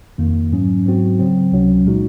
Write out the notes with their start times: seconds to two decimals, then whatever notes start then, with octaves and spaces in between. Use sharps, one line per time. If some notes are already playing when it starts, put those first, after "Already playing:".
0.18 F2 D#3 A#3
0.52 G#2 F#3 C#4
0.85 G#2 F#3 C4 F#4
1.19 C#3 F#3 C4
1.52 C#2 C3 F#3 C#4
1.86 A#2 G#3 D#4 F#4